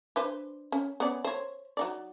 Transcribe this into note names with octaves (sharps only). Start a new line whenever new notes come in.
D4 B4 C5
C#4
B3 C#4 D5
C5 C#5
F#3 D#4 D5